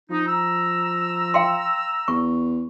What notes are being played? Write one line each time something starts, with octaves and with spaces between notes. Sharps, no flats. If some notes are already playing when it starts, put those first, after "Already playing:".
F3 D#4
A#5 E6
F5 G5 C6
E2 C#6